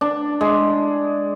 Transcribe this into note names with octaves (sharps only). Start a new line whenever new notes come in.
D4
G#3